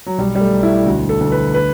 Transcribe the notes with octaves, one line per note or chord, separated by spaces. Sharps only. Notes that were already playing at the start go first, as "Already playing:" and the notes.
F#3
B1 G3
G3
A3
B1
E4
D2 F#4
A4
D2
B4
B4